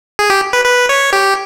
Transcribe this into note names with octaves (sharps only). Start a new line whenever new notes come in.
G#4
G4
B4
B4
C#5
G4